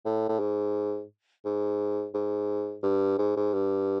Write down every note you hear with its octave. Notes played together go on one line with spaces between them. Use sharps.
A2
A2
G#2
G#2
G#2
G2
G#2
G#2
G2